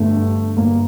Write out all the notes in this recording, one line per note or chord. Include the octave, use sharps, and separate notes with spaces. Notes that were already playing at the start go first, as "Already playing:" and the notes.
Already playing: G1 D3 A3
G2
G1 A#3